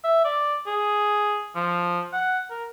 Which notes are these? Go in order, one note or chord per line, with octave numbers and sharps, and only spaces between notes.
E5
D5
G#4
F3
F#5
A#4